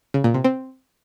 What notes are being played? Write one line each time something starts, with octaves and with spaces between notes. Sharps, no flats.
C#3
A#2
C3
C4